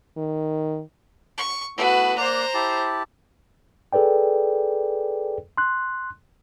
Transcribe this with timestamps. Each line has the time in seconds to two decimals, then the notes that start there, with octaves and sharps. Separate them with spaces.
0.17 D#3
1.38 C#6
1.77 A3 B3 E4 F#4 B4
2.17 A#3 C5 D5 A#5 F#6
2.54 E4 G4 A5
3.93 G#4 A4 B4 D5 G5
5.58 C6 F#6